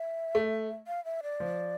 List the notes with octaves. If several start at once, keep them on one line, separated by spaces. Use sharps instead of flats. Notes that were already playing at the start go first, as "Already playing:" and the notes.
Already playing: E5
A3
F5
E5
D5
F3